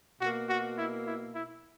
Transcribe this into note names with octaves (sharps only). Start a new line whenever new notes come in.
B2 A#3 F#4
F#4
E4
E4
E4